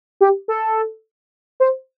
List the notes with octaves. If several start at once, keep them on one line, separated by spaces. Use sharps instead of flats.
G4
A4
C5